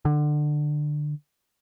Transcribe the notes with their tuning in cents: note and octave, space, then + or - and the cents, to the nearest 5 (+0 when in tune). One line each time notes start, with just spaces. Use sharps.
D3 +20